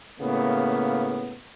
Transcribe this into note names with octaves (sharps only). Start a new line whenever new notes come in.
A2 C#3 A#3 B3